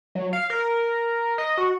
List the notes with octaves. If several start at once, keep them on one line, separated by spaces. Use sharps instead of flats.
F#3
F5
A#4
D#5
F#4